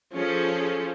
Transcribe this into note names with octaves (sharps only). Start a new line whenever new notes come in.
F3 C#4 G#4 A4